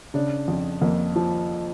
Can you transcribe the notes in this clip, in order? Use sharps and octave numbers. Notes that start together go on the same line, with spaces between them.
C#3 D4
F2
F2 A#3
F3